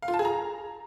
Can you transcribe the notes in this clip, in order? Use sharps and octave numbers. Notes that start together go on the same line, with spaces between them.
F5
F4
A5
G#4
A#5